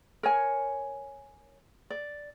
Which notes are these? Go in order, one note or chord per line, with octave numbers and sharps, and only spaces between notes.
A#4 C#5 G#5
D5